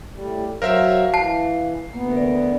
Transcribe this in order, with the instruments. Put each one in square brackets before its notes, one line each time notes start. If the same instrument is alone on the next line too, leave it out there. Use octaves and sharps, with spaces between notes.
[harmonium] A2 G3
[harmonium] F#3 [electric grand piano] A#4 C5 E5 [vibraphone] F5
[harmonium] E3 [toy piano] A5 [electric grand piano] C7
[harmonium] D2 B3 [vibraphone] A#3
[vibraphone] A#4 D5